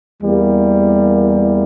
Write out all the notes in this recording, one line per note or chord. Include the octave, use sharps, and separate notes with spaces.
E2 E3 G3 A#3